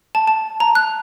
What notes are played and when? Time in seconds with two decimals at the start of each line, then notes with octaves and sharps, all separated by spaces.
0.15 A5
0.28 A5
0.60 A#5
0.75 F#6